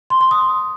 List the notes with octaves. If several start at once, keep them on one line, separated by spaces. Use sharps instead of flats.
C6
C6
D#6